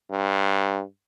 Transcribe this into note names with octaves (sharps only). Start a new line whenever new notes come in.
G2